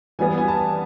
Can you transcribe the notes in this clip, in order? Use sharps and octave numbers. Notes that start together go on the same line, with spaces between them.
E3 G3 B3 G#5
G#5
A5